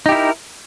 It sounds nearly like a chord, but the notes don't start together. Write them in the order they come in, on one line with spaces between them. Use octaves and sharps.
D#4 G4 E4 A#4